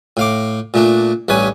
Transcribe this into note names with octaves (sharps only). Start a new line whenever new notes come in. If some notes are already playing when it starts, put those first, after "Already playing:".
A2 F5 D6
A#2 A3 D4
A1 G2 B4 C#5 G#5